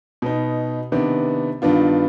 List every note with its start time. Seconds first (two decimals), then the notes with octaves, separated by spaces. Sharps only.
0.22 B2 B3 D#4
0.92 C3 D#3 B3 D4
1.62 G2 D#3 B3 D4 F4